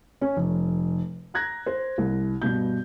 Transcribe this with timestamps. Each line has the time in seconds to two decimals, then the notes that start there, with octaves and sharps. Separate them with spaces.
0.21 C#4
0.37 F1
1.34 A#5 F#6 G#6 A#6
1.66 C5
1.98 C2
2.42 G2 B2 G6